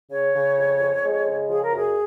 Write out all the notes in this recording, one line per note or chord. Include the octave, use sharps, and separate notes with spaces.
C#3 C#5
C#3
F2
F2
G#3
C#3
F3 G#4
A#4
F#2 G#4